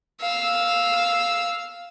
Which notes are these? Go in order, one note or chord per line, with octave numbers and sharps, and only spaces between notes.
F5 E6